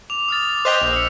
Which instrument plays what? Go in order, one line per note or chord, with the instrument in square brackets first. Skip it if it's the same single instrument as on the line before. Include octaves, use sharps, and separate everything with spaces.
[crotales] D6 F7
D#6 F6 A6
D6 D#6 A6
[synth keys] C5 D#5 G5 [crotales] F#6 B6 F7
[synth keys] A#1
[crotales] E6 C#7